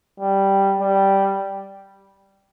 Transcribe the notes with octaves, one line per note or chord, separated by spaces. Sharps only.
G3
G3